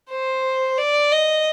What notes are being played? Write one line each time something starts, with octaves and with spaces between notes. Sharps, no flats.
C5
D5
D#5